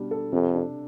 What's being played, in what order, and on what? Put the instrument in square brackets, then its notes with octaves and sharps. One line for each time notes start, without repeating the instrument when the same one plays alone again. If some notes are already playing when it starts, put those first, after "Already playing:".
Already playing: [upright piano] B2 G3 D4
A4
[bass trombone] F2 [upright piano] C3
[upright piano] D4